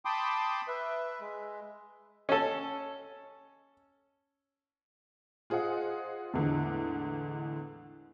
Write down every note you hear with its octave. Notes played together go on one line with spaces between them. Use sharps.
G5 A5 B5 C6 D6 D#6
B4 E5
G#3
C#4 A4
F4 G#4 C5 D#5 F#5
E2 A2 D3 G#3